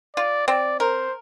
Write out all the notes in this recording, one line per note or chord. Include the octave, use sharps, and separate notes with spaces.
F4 D5
C4 D5
A#4 C5